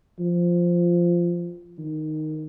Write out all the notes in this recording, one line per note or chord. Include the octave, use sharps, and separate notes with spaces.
F3
D#3